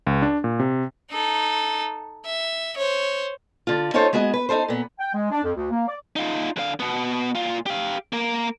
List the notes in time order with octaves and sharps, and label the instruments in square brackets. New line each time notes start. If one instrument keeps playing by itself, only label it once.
[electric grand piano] C#2
D4
A#2
C3
[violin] D#4 A4
E5
C5 C#5
[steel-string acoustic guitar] D3 F4
C#4 D#4 F4 A4 C5 C#5
G#3 B3 F#4 G#4 D#5
B4
D#4 F4 A4 C5
A#2 B3
[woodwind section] G5
G#3
D4
F2
D2
A#3
D5
[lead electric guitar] D#4 F4
D3 F5
B2 B3
A#2 F4
G4 F5
A#3 A#4